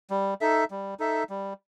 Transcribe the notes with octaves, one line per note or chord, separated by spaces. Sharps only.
G3
D#4 A4 E5
G3
D#4 A4 E5
G3